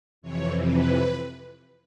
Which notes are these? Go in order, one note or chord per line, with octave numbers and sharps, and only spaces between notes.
F2 C3 E3 C#5
B4